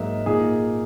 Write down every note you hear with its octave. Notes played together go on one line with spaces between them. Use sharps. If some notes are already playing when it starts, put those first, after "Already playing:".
Already playing: G#2 F#3 A#3 D#4 E5
A#2 A#3 D#4 G#4